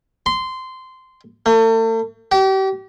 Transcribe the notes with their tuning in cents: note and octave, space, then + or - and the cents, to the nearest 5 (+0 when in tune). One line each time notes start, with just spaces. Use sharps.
C6 -15
A3 +40
G4 -35